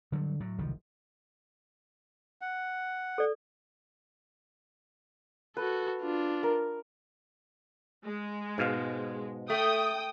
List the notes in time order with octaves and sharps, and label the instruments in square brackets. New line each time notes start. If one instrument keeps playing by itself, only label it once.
[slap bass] D3 F#3 G3
A2 F#3
F#1 C2 D#3 F3
[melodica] F#5
[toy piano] A4 D5
[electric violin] F#4 A4 [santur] B4
[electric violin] D4 F4
[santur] A#4
[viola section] G#3
[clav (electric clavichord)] G#2 B2 F5
[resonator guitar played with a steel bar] A3 [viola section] G5 [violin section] D#6